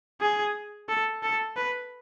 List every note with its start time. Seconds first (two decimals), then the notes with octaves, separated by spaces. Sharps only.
0.21 G#4
0.89 A4
1.23 A4
1.57 B4